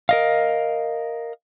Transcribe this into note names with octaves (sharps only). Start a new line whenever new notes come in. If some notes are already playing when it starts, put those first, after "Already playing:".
A#4 D#5 F5